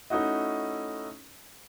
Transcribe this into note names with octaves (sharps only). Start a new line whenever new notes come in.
A3 C#4 D#4 E4 F#4 D#5